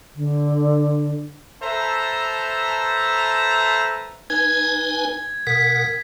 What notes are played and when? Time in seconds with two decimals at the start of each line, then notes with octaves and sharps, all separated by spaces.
0.16 D3
1.63 A4 B4 C5 E5 A5 A#5
4.30 D#4 B4 G#5 G#6
5.47 B2 A#4 F#5 B6